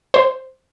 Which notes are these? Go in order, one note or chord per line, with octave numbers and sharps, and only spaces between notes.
C5